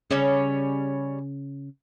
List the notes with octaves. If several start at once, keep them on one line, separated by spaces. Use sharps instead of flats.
C#3 G3 C#4 C#5